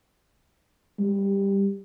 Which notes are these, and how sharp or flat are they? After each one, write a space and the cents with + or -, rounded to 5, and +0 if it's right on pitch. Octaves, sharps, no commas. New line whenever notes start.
G3 +10